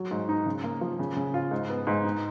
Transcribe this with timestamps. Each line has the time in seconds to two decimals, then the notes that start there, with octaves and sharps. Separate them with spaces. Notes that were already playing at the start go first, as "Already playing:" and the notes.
Already playing: F#3
0.11 G#2
0.29 D#4
0.46 C#3
0.64 A#3
0.81 F3
0.99 C#3
1.16 C#3
1.34 F4
1.51 G#2
1.69 B3
1.87 G#2
2.04 D#4